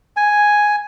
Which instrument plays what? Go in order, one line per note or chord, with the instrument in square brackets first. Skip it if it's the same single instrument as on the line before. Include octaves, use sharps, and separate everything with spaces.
[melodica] G#5